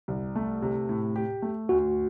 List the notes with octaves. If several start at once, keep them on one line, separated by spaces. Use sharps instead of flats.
C2
A3
C3
A2
G4
A3
D2 F#4